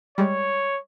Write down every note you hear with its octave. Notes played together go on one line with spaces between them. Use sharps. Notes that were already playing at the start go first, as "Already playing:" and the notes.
G3 G#3 C#5